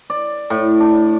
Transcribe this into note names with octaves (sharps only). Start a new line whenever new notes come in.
D5
A2
D4